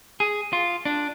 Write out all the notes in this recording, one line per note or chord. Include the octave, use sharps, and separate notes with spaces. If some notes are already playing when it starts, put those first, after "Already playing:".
G#4
F4
D4